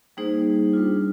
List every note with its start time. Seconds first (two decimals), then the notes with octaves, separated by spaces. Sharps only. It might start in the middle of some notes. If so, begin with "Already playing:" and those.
0.17 G3 A#3 D#4 G#4 C5
0.73 G3 D4 F4